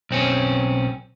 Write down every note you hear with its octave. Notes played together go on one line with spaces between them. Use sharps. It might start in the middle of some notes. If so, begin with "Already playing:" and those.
B1 C4 C#4